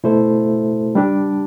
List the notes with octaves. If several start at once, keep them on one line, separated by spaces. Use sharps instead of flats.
B2 A3 E4 A4 C5
G3 D4 G4